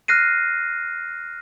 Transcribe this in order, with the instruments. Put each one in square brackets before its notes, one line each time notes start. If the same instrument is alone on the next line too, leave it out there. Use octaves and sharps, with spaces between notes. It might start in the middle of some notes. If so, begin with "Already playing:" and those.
[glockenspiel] F6 F#6 A#6 C7 D#7